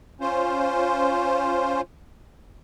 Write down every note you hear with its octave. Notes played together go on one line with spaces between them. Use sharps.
C#4 F4 C5